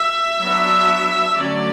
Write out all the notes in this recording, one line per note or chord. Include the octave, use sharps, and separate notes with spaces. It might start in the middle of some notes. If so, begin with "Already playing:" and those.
Already playing: E5
F#3 B3 D4
D3 F#3 A3 C#4 D5